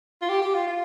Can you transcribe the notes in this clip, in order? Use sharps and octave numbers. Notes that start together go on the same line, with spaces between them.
F4
G4
G4
F4
F4